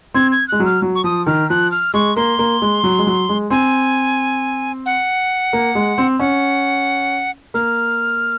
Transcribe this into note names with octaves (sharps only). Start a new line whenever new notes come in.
C4 G#6
G#6
G#3 F#6
F#3
F6
F#3
C#6
F3 D#6
D#3 F6
F3 F#6
F6
G#3 C#6
A#3 C6
A#3
G#3
F#3
G#3
F#3
G#3
C4 G#5
F#5
A#3
G#3
C4
C#4 F#5
A#3 F6